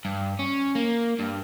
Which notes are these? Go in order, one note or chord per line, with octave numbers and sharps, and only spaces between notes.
G2
C#4
A#3
G2